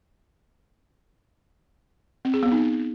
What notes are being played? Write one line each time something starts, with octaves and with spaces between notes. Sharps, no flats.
C4
G#4
B3
D#4